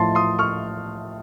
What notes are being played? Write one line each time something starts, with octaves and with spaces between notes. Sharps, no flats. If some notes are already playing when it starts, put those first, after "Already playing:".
Already playing: A2 F3 A5 C6
C6 D#6
C#6 F6